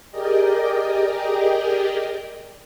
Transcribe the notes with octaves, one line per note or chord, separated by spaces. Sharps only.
G4 G#4 A#4 D5 D#5 G5